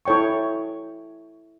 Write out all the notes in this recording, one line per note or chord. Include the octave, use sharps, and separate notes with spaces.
E4 A4 C#5 G5 C#6